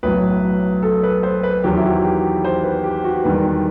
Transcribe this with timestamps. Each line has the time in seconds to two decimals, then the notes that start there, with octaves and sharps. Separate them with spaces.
0.03 B1 A2 F#3 B4
0.83 A4
1.03 B4
1.23 C5
1.43 B4
1.64 E2 D#3 F#3 G4
1.76 E4
1.84 F#4
2.04 G4
2.44 C5
2.64 B4
2.83 G4
3.04 F#4
3.24 E2 D#3 G3 B4